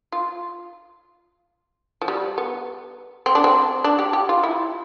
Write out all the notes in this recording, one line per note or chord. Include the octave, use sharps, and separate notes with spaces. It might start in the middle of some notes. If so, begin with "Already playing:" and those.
F4
F3
G3
B3
C4
D4
C4
D4
G4
G4
F4
E4